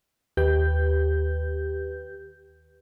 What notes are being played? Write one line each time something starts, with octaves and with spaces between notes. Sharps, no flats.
D#2 G4 B4 G6